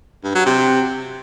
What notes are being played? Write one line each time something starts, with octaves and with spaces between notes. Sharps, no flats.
G2
F#3
C3